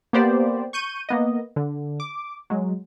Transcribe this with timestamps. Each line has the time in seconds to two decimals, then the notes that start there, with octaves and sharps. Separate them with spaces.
0.13 A#3 B3 G4 C5 D5
0.73 C#6 G6 D#7
1.09 A#3 B3 D#5
1.56 D3
2.00 D6
2.50 F#3 G#3